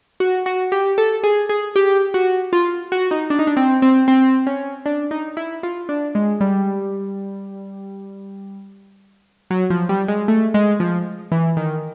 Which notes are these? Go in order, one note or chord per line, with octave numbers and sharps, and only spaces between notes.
F#4
F#4
G4
A4
G#4
G#4
G4
F#4
F4
F#4
D#4
D4
D#4
D4
C4
C4
C4
C#4
D4
D#4
E4
F4
D4
G#3
G3
F#3
F3
G3
G#3
A3
G#3
F3
E3
D#3